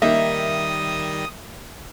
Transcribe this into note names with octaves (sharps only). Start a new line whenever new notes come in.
D#3 G3 A#3 D#4 D#5 E5 D#6